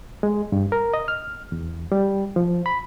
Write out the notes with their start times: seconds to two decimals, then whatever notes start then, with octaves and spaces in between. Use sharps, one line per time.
0.23 G#3
0.52 G2
0.72 A#4
0.94 D#5
1.08 F6
1.52 E2
1.92 G3
2.36 F3
2.66 B5